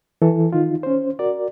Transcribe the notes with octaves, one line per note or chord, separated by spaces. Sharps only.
E3 A4
D#3 D#4 F4
C#4 C5
F#4 A#4 D5